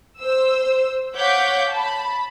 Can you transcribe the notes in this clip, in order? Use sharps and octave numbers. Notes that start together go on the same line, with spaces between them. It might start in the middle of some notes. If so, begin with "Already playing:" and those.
C5 E6
C#5 F5 F#5 D6 G6 B6
A5 B5